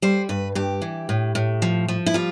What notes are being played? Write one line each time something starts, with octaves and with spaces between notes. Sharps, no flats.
G3 C5
G2 B4
G2 G4
E3
A2
A2
F3
F3
E4
G3 F4